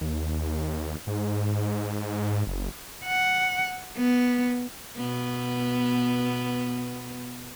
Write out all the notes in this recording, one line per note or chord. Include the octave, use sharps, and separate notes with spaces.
D#2
G#2
F#1
F#5
B3
B2 B3